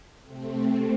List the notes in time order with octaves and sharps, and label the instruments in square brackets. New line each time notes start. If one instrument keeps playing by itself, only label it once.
[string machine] C3 A3 C4